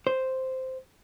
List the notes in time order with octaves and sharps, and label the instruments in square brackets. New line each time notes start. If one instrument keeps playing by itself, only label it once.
[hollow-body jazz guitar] C5